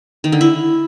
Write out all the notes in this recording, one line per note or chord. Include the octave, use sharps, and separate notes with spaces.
D#3
D3
E4